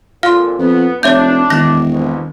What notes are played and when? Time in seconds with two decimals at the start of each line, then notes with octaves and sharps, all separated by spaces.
0.23 G#1 A#2 D3 F4 F5 C6
0.59 F2 B3
1.03 F1 D4 C#5 E5 G6
1.50 E1 D#3 A#6
1.90 C2 F2 B2